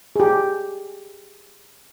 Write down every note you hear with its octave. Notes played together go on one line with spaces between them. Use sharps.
G4 G#4